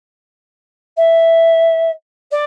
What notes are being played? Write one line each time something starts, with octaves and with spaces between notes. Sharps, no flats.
E5
D5